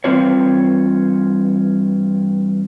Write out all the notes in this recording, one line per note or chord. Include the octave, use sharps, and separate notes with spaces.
G2 E3 C4 F4 C#5